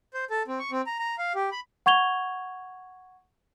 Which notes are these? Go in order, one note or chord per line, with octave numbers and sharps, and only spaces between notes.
C5
A4
C4
C#6
C4
A#5
A#5
F5
G4
B5
F#5 C#6 G#6 F7 G7